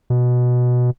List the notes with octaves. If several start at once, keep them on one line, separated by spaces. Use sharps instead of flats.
B2